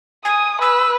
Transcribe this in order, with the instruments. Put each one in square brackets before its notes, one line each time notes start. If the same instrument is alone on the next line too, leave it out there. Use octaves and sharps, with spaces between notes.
[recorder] G#5 [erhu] D#6
[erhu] B4 [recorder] E6